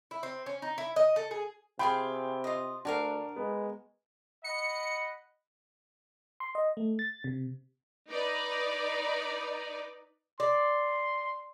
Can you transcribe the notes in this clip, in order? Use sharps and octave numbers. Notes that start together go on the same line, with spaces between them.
E4
C4
C#4
D#4
E4
D#5
A4
G#4
C3 F4 G#4 F5 G5 B5
F4 D#5
D2 D4 F#4 A#4 F5
G#3 B3
D#5 F#5 B5 C#7
C6
D#5
A3
A6
C3
D#4 B4 D5
D5 C6